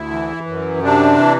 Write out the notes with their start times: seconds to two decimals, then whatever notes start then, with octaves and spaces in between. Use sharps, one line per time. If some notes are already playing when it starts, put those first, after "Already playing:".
Already playing: D2 E4
0.11 E3
0.47 F#2
0.83 C3 D4
1.18 E3